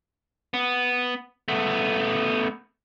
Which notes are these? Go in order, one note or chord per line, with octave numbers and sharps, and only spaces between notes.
B3
A3 B3